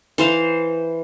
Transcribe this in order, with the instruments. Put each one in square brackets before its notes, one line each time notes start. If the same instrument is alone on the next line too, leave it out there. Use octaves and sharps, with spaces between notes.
[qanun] E3 C5 F5